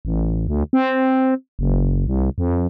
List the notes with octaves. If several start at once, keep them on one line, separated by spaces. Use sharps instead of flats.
A1
D2
C4
F#1
C2
F2